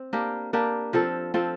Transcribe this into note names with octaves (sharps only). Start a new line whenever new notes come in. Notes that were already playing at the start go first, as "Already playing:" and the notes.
Already playing: C4
A#3 D4 G4 A#4
A#3 D4 G4 A#4
F3 C4 F4 A4
F3 C4 F4 A4